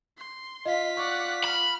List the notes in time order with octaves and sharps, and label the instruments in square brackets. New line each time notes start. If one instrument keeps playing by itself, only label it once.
[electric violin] C6
[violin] F4 B6 [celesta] D#5 F5
[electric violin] D5 F#5 [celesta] C#6
[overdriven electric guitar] B5 [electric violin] F6